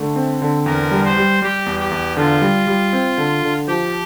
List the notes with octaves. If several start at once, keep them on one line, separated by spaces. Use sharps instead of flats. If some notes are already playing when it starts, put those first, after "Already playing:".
Already playing: D3 A3
C4
D3
E2 A#4
G3
C5
G3
G3 G4
E2
G4
E2
D3 F4
G3
G3
C4
D3
D3
F3 G4